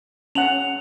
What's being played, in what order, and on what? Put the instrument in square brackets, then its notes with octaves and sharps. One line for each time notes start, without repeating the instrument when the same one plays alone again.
[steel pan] C#4 F#5 [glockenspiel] F7 F#7